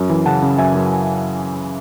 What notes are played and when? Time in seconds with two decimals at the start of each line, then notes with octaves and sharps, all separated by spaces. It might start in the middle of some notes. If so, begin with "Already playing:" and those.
Already playing: F#2
0.10 E3
0.26 C#3 F#5 A5
0.42 C#3
0.58 F#2 E5 G#5
0.75 F#2